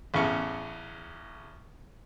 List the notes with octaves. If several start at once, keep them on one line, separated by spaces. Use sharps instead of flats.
A1 E2 C#3 C#6